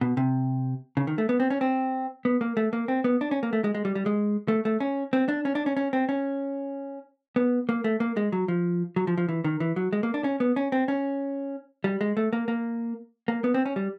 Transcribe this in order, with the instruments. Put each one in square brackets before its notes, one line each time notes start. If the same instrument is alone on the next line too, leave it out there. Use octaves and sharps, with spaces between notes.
[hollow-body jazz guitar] B2
C3
C#3
D#3
A3
B3
C4
C#4
C4
B3
A#3
A3
A#3
C4
B3
D4
C#4
A#3
A3
G#3
G#3
G3
G3
G#3
A3
A3
C#4
C4
D4
C#4
D4
C#4
C#4
C4
C#4
B3
A#3
A3
A#3
G#3
F#3
F3
F#3
F3
F3
E3
D#3
E3
F#3
G#3
A#3
D4
C#4
B3
C#4
C4
C#4
G3
G#3
A3
A#3
A#3
A#3
B3
C4
C#4
G3